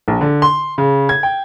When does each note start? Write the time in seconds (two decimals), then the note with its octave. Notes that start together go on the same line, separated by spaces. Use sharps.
0.08 A#1
0.21 D3
0.42 C6
0.78 C#3
1.09 G#6
1.23 G5